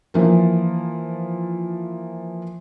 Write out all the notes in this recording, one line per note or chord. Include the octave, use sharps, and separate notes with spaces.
E3 F3 A#3